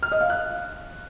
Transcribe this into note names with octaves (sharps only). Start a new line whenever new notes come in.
F6
D#5
F5
F#6